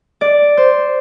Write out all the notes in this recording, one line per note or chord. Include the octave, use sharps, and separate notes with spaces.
D5
C5